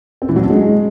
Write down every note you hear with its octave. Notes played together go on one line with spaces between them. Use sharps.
C4
E3
F#3
D4
G#3